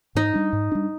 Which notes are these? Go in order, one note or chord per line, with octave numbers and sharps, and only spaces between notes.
G#2 D#4
G3 D4
G#2
G3 D4